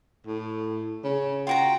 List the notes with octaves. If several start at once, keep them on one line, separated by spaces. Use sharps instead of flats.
A2
C#3
F4 F#4 G5 A#5